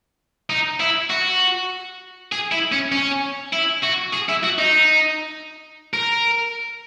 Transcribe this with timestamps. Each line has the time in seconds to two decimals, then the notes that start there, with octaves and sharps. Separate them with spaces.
0.50 D#4
0.80 E4
1.10 F#4
2.32 G#4
2.52 E4
2.72 C#4
2.92 C#4
3.53 E4
3.83 F#4
4.13 G#4
4.29 E4
4.43 F#4
4.59 D#4
5.94 A#4